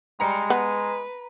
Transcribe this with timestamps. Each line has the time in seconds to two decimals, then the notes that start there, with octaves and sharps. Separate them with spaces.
0.20 G3 G#3 A#5 C#7
0.50 B3 B4